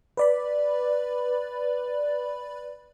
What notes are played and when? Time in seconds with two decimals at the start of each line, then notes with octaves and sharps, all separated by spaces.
0.17 B4 D5 B5